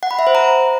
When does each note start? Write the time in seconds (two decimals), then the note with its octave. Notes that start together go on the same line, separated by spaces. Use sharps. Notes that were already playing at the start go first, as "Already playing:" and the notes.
0.03 F#5
0.11 B5
0.19 E5
0.27 C5
0.35 A#5